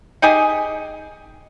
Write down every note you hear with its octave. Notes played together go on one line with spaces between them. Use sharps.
D#4 G4 G#4 G#5